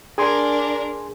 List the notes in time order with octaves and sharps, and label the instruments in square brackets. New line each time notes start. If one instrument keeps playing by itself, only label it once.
[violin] D4 A#4 [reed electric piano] G#4 G#5 C6